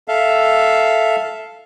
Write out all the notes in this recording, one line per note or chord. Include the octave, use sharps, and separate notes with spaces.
A4 E5 F5